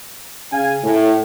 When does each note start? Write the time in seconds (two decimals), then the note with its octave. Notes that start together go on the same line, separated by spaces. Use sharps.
0.51 C#3 F5 G#5
0.83 A2